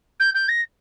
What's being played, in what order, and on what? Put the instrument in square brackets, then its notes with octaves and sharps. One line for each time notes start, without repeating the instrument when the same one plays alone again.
[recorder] G6
G6
A#6